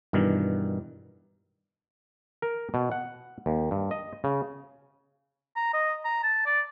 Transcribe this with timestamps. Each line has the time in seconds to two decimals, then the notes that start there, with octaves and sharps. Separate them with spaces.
0.13 G2 B2 D#3 E3
2.42 A#4
2.74 B2
2.92 F#5
3.46 D#2
3.71 G2
3.91 D#5
4.24 C#3
5.56 A#5
5.74 D#5
6.05 A#5
6.23 A5
6.46 D5